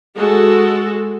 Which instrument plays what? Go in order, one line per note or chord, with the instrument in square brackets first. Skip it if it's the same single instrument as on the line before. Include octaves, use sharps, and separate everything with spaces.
[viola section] G#3 F#4 A4